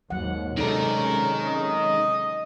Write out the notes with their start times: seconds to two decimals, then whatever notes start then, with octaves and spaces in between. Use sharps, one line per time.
0.10 D#2 G#2 F#3 F#5
0.58 C3 D#3 G#3 C#4 D#4 A4 A#4 D5
1.47 D#5